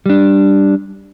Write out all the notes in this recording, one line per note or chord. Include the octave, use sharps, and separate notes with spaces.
G3 D4